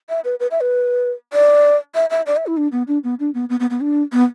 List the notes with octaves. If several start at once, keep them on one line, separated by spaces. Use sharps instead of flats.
E5
B4
B4
E5
B4
D5
E5
E5
D5
E5
E4
D4
B3
D4
B3
D4
B3
B3
B3
B3
D4
B3